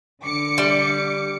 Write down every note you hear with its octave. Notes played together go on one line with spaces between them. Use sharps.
D3 D6 C#7
G3